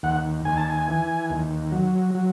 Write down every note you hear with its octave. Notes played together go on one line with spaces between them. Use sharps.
D#2 F#5
D#2 G#5
A5
G#5
E3
D#2
F#3
F#3